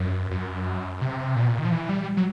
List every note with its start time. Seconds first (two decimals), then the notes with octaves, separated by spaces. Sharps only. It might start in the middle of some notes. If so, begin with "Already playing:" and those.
Already playing: F#2
0.31 F#2
1.02 C3
1.36 A#2
1.42 B2
1.48 A#2
1.59 D#3
1.65 F3
1.71 E3
1.89 G3
2.17 F#3